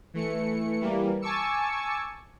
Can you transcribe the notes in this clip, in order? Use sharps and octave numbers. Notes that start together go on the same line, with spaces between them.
E3 A3 C#7
E3 G3 A#3
G#5 A5 C#6 D6 E6 C#7